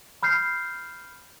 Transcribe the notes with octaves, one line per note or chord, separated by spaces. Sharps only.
B5 F6 G6 C7